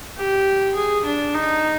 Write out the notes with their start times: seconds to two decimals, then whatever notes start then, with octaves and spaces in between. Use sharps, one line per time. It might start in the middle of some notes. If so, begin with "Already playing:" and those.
0.17 G4
0.75 G#4
1.05 D4
1.34 D#4